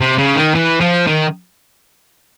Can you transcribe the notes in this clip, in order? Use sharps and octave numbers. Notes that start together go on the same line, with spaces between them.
C3
C#3
D#3
E3
F3
D#3